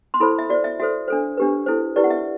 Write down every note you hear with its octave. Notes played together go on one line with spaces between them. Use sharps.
C6
E4 A4 C5 B5
E5
F#4 C5 D5
E5
F#4 A4 C5 E5
D4 A4 C5
D4 G4 B4
E4 A4 C5
E4 G4 B4 D5
F#5
E5